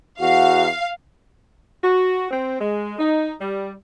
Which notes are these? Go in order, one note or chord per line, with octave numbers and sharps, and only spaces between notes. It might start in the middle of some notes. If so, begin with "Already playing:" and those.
E2 F#4 F5
F#4
C4
G#3
D#4
G3